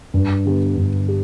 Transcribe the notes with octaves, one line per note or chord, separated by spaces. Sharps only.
G2
D3 B3 G4
G2
G4